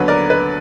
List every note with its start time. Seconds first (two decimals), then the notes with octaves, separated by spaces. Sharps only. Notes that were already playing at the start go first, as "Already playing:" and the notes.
Already playing: D#2 D3 F#3 B3 B4
0.08 A#4 D5
0.30 B4